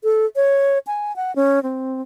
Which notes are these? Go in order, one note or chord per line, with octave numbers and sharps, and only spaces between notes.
A4
C#5
G#5
F#5
C#4
C4